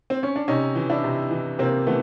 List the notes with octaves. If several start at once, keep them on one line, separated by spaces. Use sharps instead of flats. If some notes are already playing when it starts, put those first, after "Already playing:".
C4
C#4
D4
C3 C#4 D#4
E3
D4 E4
C3
E3
C3 A#3 C4
E3 A3 B3